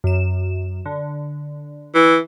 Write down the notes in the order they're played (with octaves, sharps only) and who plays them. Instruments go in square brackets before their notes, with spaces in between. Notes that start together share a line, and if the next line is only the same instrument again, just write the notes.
[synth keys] F#2 E7
D3
[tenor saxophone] E3